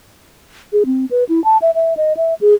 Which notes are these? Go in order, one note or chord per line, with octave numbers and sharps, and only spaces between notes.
G#4
C4
B4
E4
A5
E5
E5
D#5
E5
G#4